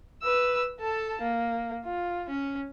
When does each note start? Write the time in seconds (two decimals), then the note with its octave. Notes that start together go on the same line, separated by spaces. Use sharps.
0.22 B4 E6
0.81 A4 A5
1.22 A#3
1.85 F4
2.29 C#4